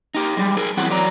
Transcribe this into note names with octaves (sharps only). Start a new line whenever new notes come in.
D#4 G4
G3 G#3
G#4 A#4
E3 F#3 C4 E4 C5 F#5
F#3 D5 A#5